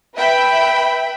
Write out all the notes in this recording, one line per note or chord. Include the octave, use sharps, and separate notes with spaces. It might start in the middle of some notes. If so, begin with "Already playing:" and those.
B4 E5 G5 B5